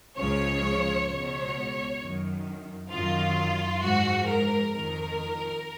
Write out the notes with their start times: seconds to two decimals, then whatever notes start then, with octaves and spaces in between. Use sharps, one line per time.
0.17 C#2 C#3 F3 C#5
1.08 C#2 B2 C#5
2.00 F#2 D#3
2.90 F#2 D#3 F4
3.82 G#2 F3 F#4
4.27 A#4
4.72 F2 D#3 A#4